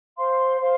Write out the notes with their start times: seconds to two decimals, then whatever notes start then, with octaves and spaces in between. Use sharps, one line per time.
0.17 C5 F5 C6
0.60 C5 F5 C6